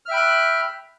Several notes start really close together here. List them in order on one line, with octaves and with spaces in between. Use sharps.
F6 E5 G5 B5 F#6